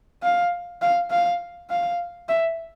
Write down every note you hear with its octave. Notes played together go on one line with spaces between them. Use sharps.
F5
F5
F5
F5
E5